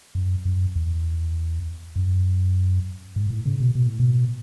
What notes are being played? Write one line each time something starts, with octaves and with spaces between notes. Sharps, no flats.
F#2
F#2
E2
F#2
G#2
A2
C#3
B2
B2
A2
B2